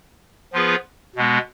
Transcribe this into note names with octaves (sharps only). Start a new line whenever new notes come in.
F3 B3 F4 G#4 B4
B2 G#3 B3